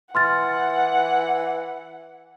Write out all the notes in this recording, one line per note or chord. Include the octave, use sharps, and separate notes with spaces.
E3 F#5 C6 F6 A6